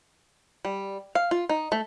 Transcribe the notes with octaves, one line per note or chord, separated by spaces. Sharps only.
G3
F5
F4
D#4
A3